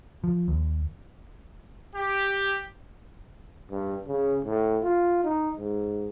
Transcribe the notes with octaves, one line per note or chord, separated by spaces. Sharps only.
F3
D#2
G4
G2
C#3
A2
F4
D#4
G#2